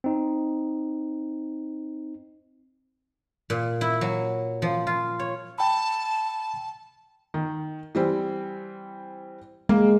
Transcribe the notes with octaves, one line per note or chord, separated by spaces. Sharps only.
C4 D#4
A#2
E4
F#3
F3
F4
C#5
G5 A5 B5
D#3
E3 G3 C4
G#3 A#3